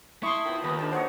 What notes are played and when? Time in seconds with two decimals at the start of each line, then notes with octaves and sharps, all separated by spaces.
0.23 E4 A5 C6 C#6 D#6
0.45 D#3 F3 B3
0.64 D#2 A#3 B4
0.79 D3 D#3 A5
0.93 F#3 C5 C#5 D#5 F#5